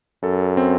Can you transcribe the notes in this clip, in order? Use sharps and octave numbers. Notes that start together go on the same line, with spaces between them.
F#2 A4
C4